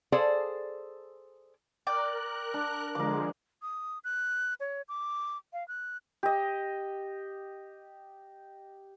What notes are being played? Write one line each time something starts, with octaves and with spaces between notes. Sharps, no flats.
G#4 A4 C5 D5 F5
A#4 D5 G5 F#6
D4
D3 F3 G#3 A#4 D6
D#6
F#6
C#5
D6
F5
F#6
G4 D#5